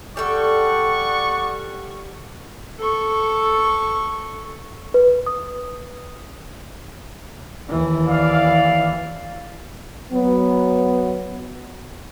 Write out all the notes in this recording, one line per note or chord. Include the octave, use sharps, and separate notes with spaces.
G3 A4 D5 F#5 C#6
A4 C#6
B4
D#6
D#2 E3
D5 F5
F#3 B3